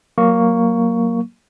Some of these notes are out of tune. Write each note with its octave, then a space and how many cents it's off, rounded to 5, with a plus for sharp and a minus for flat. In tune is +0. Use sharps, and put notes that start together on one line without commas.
F#3 +0 A#3 +0 C#6 +10